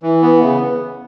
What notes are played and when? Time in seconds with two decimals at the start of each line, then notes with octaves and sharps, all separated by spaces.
0.03 E3
0.22 B3
0.42 C#3